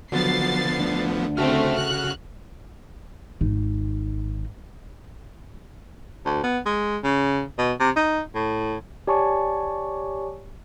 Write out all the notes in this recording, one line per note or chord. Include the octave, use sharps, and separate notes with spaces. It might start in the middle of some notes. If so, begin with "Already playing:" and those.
D3 F3 F#3 B3 A6 C7
D2
C#3 A3 C4 F#4 F6
F#6
G#1 D#4
D2
B3
G#3
C#3
B2
C3
D#4
A2
G4 C#5 D5 G#5 A5 C#6